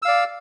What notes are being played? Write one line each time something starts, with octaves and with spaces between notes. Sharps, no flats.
D5 F5 E6